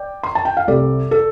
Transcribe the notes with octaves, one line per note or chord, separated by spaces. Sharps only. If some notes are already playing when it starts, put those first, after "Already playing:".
Already playing: D5 G5
C6
A5
G5
F5
C2 C3 G3 A4 D5
A4